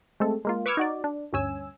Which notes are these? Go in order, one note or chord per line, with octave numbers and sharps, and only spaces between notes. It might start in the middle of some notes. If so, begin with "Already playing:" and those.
G#3 A3 C4 A4
G#3 A#3 F4
B4 C#6 D6 E6 F6 G#6
D#4 F#4 D5
D4
D2 G2 C#4 G#5 E6